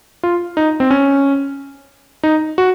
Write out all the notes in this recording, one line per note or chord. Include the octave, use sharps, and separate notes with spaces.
F4
D#4
C4
C#4
D#4
F#4